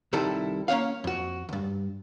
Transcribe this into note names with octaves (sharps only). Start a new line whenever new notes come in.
C2 C3 D#3 G3 E4 A4
A#3 C#4 D#4 C#5 F5
F2 F#4
D2 G2